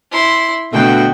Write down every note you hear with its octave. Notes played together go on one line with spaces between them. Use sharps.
E4 C6
B2 D3 A3 F#4 G5